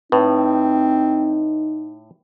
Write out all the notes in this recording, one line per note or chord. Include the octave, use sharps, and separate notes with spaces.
A2 C4 D#4 B4